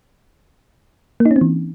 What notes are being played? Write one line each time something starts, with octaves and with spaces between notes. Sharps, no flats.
A#3
D#4
C#4
C4
E3